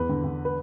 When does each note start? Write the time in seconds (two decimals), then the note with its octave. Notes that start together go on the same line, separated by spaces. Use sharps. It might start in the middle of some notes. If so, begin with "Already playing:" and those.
Already playing: E2 B4
0.09 D3
0.24 D3
0.45 B4